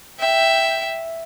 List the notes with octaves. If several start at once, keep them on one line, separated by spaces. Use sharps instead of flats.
E5 G5